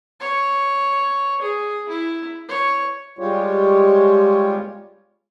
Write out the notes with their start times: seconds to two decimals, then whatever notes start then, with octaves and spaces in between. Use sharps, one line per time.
0.20 C#5
1.41 G#4
1.89 E4
2.48 C#5
3.19 G3 G#3 F4 G4 C#5